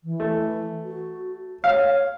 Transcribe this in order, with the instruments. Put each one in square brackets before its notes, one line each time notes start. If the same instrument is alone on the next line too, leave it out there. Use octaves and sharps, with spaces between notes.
[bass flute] E3
[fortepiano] A3
[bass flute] F#4
[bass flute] C#5 [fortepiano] F5